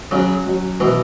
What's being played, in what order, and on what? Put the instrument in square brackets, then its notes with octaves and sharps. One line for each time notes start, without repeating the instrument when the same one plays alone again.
[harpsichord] C#3 F#3 [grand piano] C#4
[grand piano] F#3
[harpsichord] B2 E3 [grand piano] F#4